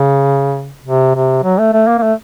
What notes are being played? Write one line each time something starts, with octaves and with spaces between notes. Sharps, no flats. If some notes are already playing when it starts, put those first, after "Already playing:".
Already playing: C#3
C3
C3
F#3
A3
A3
A#3
A#3
A3